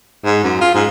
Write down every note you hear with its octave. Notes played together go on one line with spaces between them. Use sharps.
G#2
F#2
F4
G#2